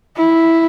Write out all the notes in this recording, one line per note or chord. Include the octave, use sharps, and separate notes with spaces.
E4